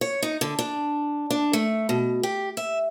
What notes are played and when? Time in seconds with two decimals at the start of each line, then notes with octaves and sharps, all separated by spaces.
0.01 C#5
0.23 D#4
0.41 D3
0.59 D4
1.30 D4
1.53 A3
1.89 B2
2.23 G4
2.57 E5